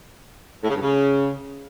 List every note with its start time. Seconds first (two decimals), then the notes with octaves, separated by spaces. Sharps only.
0.63 A2
0.69 C#3
0.75 G2
0.81 C#3